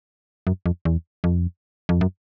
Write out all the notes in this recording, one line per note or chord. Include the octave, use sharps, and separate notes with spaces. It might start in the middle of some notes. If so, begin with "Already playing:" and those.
F#2
F2
E2
F2
F2
F#2